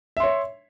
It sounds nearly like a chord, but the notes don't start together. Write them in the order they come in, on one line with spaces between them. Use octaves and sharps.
E5 C6 C#5